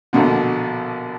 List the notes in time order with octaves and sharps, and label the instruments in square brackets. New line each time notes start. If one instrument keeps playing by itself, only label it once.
[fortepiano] A#1 B2 D3